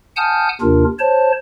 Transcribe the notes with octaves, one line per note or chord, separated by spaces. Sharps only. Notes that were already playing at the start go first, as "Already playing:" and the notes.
F#5 G#5 A5 D#6 F6 G6
D#2 C3 D4 F4 A#4
C5 C#5 A5